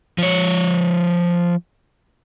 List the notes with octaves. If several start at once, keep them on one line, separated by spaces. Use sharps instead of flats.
F3 C#5